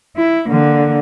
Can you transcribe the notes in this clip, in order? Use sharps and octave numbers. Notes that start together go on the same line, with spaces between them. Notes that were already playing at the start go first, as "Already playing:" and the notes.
E4
D3 A#3